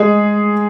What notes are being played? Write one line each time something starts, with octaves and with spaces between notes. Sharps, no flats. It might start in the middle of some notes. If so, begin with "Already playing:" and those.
Already playing: G#3 G#4